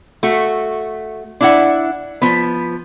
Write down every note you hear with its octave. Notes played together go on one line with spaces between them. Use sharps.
A3 F#4
D4 E4 F#5
F3 B3